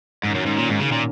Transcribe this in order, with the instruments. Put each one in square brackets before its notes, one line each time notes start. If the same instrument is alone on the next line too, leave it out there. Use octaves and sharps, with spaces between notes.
[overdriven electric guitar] G#2 [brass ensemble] D#3 A#3 C#4 F#4
[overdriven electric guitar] F#2
G#2
A#2
G#2
C#3
A#2